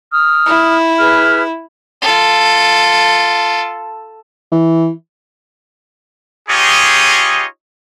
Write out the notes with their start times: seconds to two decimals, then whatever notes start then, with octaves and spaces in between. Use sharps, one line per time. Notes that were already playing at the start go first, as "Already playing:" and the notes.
0.11 D#6 F6
0.46 E4
0.99 G#4 B4 F6
2.02 F4 A4
4.52 E3
6.49 D#4 F4 G4 G#4 C#5 D#5